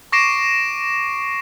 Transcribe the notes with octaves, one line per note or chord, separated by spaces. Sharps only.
C#6 D6 A#6 C7 D7 E7